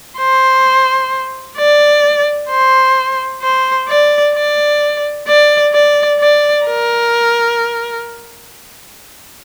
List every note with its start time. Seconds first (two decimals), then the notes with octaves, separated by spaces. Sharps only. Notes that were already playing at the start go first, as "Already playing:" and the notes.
0.18 C5
1.57 D5
2.50 C5
3.42 C5
3.89 D5
4.35 D5
5.28 D5
5.73 D5
6.20 D5
6.66 A#4